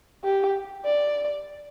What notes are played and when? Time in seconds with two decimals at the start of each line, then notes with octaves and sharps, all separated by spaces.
0.24 G4
0.85 D5